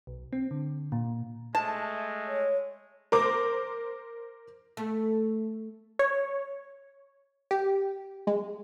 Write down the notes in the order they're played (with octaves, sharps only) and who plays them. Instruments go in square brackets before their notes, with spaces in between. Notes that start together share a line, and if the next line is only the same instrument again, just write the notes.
[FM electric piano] B1
C4
D3
A#2
[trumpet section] G#3 A3 [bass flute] E5 [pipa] A5
[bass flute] C#5
[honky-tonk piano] A#4 C5 D6
[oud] A3
[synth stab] C#5
G4
G#3